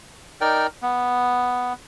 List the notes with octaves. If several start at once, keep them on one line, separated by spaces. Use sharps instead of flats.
D#4 A#4 D5 G5
B3